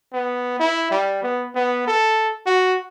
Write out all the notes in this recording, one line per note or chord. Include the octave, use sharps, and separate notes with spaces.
B3
E4
G3
B3
B3
A4
F#4